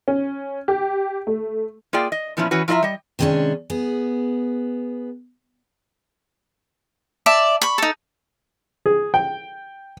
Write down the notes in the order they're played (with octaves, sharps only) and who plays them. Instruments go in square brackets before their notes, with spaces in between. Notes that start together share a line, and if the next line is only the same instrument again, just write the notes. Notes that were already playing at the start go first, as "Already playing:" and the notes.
[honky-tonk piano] C#4
G4
A3
[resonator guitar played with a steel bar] A#3 F4 G#4 D5 G5
D#5
A#2 F3 B3 C#4 E4
E3 C#4 F#4 B4
F3 E4 F4 D5 E5 A#5
G3 D#5
[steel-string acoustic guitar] C3 D#3 G#3 B3 C#4 D4
B3 G#4
[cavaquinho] D5 E5 A5
B5 C#6
D#4 A4
[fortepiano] G#4
G5